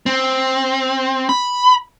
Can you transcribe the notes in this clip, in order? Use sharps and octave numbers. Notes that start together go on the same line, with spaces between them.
C4
B5